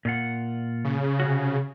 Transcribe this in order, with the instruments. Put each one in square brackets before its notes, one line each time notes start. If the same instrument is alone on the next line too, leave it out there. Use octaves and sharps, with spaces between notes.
[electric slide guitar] A#2 F4 F#5
[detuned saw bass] C#3
[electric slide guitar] C3 C#4 F#4